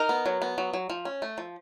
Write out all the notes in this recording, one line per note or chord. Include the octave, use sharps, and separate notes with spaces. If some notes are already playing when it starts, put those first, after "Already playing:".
Already playing: D#4 A#4
B3
F#3
B3
F#3
F#3
F3
C#4
A3
F3